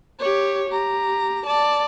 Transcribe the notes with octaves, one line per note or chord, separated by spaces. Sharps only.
G4 C#5
G4 A#5
D5 A5